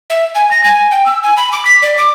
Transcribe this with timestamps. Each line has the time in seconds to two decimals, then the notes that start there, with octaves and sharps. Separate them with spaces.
0.10 E5
0.35 G#5
0.51 A#6
0.64 G#5
0.91 G5
1.06 E6
1.23 G#5
1.37 B5
1.52 D6
1.65 B6
1.82 D5
1.98 D6